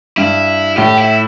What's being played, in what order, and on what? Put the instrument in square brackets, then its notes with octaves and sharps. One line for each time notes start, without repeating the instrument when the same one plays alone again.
[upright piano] G2 [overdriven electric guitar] E4
[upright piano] A2 [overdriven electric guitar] G4
[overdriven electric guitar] E4